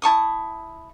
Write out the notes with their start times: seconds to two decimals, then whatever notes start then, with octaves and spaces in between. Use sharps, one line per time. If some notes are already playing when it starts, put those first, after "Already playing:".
0.02 E4 A5 C#6 D#6